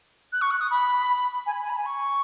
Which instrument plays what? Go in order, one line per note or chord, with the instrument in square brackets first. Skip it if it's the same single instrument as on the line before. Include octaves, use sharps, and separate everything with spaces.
[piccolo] F#6
C#6
F#6
D#6
B5
G#5
B5
G#5
B5
G#5
C#6